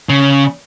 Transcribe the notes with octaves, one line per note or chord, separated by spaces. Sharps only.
C#3